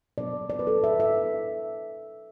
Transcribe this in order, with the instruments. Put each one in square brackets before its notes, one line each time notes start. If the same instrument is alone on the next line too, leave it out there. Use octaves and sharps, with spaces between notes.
[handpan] B2 F#3 B3 D4 D5
D5
B4
B2 F#3 D4 A4
E5
E5